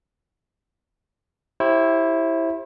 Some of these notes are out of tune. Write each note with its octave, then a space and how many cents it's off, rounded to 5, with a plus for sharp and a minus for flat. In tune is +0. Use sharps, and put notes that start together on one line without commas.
E4 +0 G4 +0 C5 +35